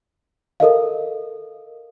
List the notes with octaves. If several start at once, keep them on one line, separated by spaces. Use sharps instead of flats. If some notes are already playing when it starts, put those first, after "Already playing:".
A4 A#4 D#5 F5